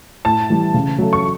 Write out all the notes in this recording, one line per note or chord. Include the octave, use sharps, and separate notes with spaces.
A2 A5
E3 G3
C#3
F#3 A3
C#6